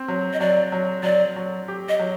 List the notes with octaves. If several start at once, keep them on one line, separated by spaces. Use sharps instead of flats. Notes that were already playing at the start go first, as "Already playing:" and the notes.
Already playing: C4
F#3
D#5
F#3 D5
F#3
F#3 D5
F#3
G4
D#5
F#3